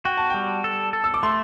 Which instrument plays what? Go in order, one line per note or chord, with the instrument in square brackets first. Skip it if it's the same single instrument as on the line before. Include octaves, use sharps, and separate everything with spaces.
[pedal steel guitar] F#4 [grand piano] G5
[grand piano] A5
[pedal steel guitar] G3 [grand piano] G5
[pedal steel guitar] A4
A4
[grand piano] E6
D6
[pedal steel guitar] A3 [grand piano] C6